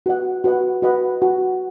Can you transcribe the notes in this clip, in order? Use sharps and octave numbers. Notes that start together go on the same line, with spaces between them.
F#4 B4 D#5 F#5
F#4 B4 D#5 F#5
F#4 B4 D#5 F#5
F#4